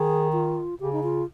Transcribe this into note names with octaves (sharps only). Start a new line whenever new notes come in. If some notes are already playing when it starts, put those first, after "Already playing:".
Already playing: D#3 G#4
F4
C#3 G4
D#4
F4